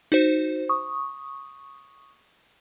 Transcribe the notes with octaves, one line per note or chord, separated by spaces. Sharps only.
D#4 F#4 C5
C#6 D#6